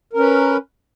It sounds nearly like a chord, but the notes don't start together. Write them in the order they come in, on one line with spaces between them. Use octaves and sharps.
A#4 C#4 B4